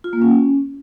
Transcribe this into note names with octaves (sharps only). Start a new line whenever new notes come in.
F4
A#3
C#4